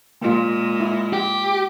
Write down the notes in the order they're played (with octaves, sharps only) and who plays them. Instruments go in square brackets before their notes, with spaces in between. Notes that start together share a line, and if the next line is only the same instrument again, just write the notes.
[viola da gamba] A#2 G#3 [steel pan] A#3 F4
[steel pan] E4
[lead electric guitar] G4